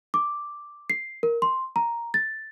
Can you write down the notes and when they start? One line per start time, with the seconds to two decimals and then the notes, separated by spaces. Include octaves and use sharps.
0.14 D6
0.90 C7
1.23 A#4
1.42 C6
1.76 A#5
2.14 A6